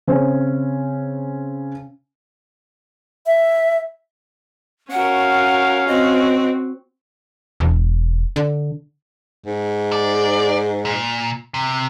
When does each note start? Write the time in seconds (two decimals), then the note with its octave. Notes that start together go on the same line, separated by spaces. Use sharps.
0.07 C#3 C4 C#4
3.26 E5
4.91 C#4 F#4 A#4 F5 F#5
5.87 C4 F#4 D#5
7.60 E1
8.36 D3
9.45 G#2
9.92 D5
10.85 A#2
11.54 C3